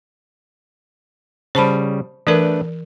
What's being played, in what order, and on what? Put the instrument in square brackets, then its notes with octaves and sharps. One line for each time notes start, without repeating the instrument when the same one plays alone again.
[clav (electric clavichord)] C#3 G3 [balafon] C5 A5 B5
[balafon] E3 A#4 [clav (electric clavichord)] A3 D4 B4